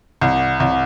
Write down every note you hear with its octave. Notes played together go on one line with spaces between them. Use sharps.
C2
C2